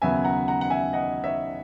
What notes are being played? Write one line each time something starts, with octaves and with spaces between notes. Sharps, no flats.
D#2 C#3 F#3 B3 E5 G#5
F#5 A#5
F#5 A#5
F#5
E5 G#5
D#5 F#5
C#5 E5